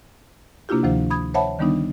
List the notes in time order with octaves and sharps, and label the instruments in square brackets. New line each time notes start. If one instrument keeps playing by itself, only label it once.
[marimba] C3 A#3 D4 E4 F4 G4
D2 C3 D#3 F3 C5
B5 D#6 G#6
C5 C#5 E5 F#5 A5 B5
D3 D#3 G3 B3 D4 D#4